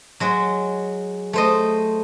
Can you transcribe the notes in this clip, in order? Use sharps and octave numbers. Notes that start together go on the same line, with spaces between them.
F#3 G#3 F#4
A3 C5 D#5